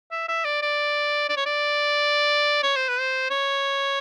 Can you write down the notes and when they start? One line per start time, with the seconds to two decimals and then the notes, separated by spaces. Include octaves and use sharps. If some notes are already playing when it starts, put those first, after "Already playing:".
0.11 E5
0.28 E5
0.45 D5
0.62 D5
1.29 D5
1.37 C#5
1.46 D5
2.63 C#5
2.76 C5
2.88 B4
3.00 C5
3.30 C#5